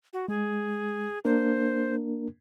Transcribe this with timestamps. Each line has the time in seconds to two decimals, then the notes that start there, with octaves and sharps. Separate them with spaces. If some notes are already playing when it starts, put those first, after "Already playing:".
0.13 F#4
0.28 G#3 G#4
1.25 A#3 D4 A#4 C5